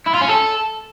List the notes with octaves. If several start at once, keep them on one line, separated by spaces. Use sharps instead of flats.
E4
F4
C#4
A4